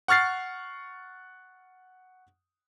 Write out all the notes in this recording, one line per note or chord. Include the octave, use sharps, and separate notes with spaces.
F#5 C#6 F6 A6 C7